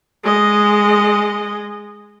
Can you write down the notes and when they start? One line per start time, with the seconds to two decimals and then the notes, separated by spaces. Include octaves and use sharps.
0.24 G#3 D#5